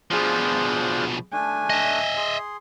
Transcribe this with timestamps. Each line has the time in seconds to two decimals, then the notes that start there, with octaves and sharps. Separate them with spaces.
0.11 B2 F3 D4 F4 G#4 C5
1.33 A3 D4 G#5
1.70 D#5 E5
2.17 G#4 C6